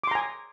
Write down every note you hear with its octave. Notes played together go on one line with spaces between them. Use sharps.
G#5 A#5 C6 D6